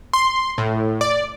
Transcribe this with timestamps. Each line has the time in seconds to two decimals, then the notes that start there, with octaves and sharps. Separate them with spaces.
0.13 C6
0.58 A2
1.01 D5